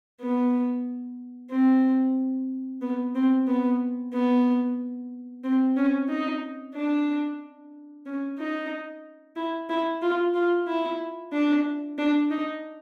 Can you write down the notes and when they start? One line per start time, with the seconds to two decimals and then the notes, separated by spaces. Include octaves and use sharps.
0.21 B3
1.51 C4
2.81 B3
3.15 C4
3.47 B3
4.13 B3
5.44 C4
5.77 C#4
6.09 D#4
6.75 D4
8.06 C#4
8.39 D#4
9.36 E4
9.69 E4
10.02 F4
10.34 F4
10.68 E4
11.32 D4
11.98 D4
12.31 D#4